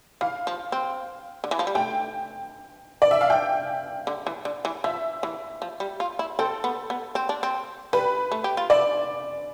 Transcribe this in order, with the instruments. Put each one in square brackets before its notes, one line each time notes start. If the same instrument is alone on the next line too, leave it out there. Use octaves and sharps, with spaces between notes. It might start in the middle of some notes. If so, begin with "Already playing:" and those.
[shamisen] E3 [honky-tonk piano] F5
[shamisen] F3
C4
D3
E3
F3
G3
[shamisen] A3 [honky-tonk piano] G5
[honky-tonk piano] D5
E5
F5
G5
[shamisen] D3
E3
D3
E3
[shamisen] F3 [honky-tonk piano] E5
[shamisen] E3
F3
G3
F4
E4
[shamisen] C4 [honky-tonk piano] A4
[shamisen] B3
B3
C4
D4
C4
[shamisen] G3 [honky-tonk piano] B4
[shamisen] A3
G4
F4
[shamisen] E4 [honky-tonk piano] D5